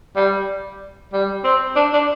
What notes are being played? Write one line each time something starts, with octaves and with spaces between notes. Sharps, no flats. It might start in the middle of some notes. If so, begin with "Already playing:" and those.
G3
G3
C4
D4
D4